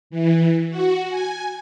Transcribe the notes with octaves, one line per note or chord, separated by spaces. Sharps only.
E3
F#4
G#5